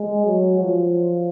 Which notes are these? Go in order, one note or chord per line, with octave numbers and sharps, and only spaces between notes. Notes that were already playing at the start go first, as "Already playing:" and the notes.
Already playing: G#3
F#3
F3